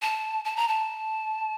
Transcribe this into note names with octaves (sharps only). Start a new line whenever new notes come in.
A5
A5
A#5
A5